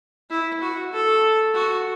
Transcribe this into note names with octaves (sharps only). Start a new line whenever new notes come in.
E4
F#4
A4
F#4